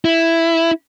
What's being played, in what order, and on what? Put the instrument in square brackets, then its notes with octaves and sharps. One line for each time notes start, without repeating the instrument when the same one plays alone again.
[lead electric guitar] E4